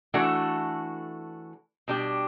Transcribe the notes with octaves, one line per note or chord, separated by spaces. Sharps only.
E3 A3 D4 F#4 A4
B2 G3 D4 G4